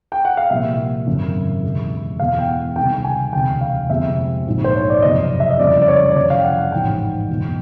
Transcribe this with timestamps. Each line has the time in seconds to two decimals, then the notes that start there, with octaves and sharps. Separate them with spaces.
0.12 G5
0.25 F#5
0.37 F5
0.50 C2 A#2 F3 E5
1.07 G#1 F#2 C#3
1.63 E2 B2 G#3
2.20 E2 B2 G#3 F5
2.39 G5
2.47 F#5
2.76 C#2 C3 D#3 G3 G5
3.04 G#5
3.33 E1 D2 C3 G5
3.61 F5
3.90 G1 F2 C3 E3 G#3 E5
4.47 A#1 G#2 F3
4.64 C5
4.77 C#5
4.90 D5
5.02 F#1 F2 C3 D#5
5.40 E5
5.51 D#5
5.59 F2 C#3 E3 G3 D5
5.82 D5
5.88 C#5
6.11 D5
6.16 F1 F2 C#3 C#5
6.30 F5
6.37 G5
6.44 F#5
6.58 F#5
6.72 A1 G#2 F3 G#3 G5
7.29 F#1 E2 B2